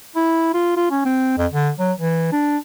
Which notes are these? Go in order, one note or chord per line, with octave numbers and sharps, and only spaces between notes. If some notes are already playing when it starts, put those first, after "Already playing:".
E4
F4
F4
C#4
C4
F2
D3
F#3
E3
D4